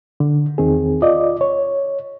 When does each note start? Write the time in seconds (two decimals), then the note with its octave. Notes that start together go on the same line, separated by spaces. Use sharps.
0.20 D3
0.58 E2 D#3 C4 G#4
1.02 F4 D5 D#5
1.41 C#5